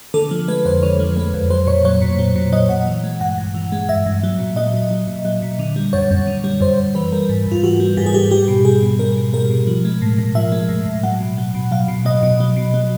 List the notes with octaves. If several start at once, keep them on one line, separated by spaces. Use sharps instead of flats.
D3 A4
F3
G#3 B4
F2 C5
D3 C#5
F3
G#3 B4
F2
F#3 C5
A#2 C#5
F#3 C#5
A#2
F#3
A#2
F#3 D#5
A#2 F#5
E3
G#3
G2 F#5
G2
E3
G#3
G2 E5
G2
F#3
A#2
F#3 D#5
A#2
F#3
A#2
F#3
A#2
D3
G3
F#2 C#5
F#2
D3
G3
F#2 C5
F#2
E3 B4
G3 A#4
G#2
G#2 F4
E3 F#4
G3
G#2 G4
G#4
G#2 G4
G3 G4
B2
G3 G#4
B2
G3 A#4
B2
G3 A#4
B2
F3
G#3
A2
A2
F3 E5
G#3
A2
A2
F#3 F#5
B2
F#3
B2
F#3 F5
B2
F#3 D#5
B2
F#3
B2
F#3